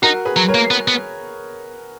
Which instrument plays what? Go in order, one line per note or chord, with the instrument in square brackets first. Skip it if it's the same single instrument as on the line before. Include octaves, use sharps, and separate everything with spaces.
[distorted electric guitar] D#4 [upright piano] F#4 A#4
[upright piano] G#4 B4
[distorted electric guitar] F#3
[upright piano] A#4 C#5
[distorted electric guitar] A#3
B3
B3